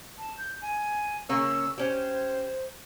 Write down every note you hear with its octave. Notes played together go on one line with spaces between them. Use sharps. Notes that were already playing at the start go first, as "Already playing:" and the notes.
A5
G6
G#5
C#3 A#3 C#4 E6
C#4 G4 C5